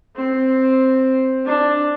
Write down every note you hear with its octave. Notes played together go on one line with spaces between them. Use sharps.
C4
D4